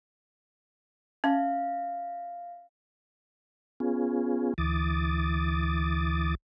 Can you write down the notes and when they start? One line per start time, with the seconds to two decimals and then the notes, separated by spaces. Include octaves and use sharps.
1.24 C#4 E5 F5
3.80 B3 C#4 F4 G#4
4.58 D2 E3 D6 D#6 A6